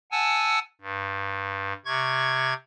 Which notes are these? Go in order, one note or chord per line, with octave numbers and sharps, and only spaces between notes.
F#5 G#5 A5 E6
G2
C3 C#6 G#6